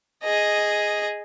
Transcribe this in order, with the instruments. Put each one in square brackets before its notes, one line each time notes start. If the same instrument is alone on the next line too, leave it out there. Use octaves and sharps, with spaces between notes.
[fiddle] G#4 D#5